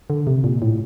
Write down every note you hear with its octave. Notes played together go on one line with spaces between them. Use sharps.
D3
C3
A#2
A2